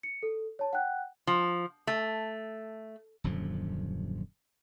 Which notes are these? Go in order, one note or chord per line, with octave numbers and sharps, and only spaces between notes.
C#7
A4
C#5 A5
F#5 G5 F#6
F3
A3
D#1 F#2 D3 F3